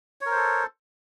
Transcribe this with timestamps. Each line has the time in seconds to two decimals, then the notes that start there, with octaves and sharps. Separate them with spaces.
0.21 C#5
0.26 A#4
0.31 C5
0.36 A4